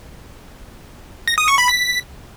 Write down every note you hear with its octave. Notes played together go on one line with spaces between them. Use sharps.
A#6
D#6
C#6
B5
B6